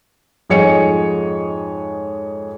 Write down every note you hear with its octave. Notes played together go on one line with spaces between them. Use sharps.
F2 G#2 G#4 C#5 D#5 C#7